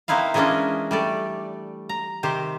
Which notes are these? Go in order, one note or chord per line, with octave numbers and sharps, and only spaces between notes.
A#3 C4 D#4 E4 B4 F5
E3 G#3 A#3 C#4 D4 D#5
G3 A3 D5
A#5
C3 D#3 G4 C5